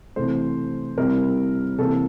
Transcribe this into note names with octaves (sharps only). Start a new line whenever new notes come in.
C3 E3 A3 C5
C3 G3 C4 E4 A#4
C3 E3 A#3 A4